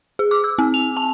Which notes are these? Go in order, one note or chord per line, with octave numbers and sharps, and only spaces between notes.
G#4
D6
E6
C4
F7
A5